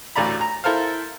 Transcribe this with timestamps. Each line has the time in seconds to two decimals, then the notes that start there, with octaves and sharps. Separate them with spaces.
0.16 A1 D2 A2 D5 A#5 B5
0.41 A#5
0.64 E4 A4 A#4 C5 F5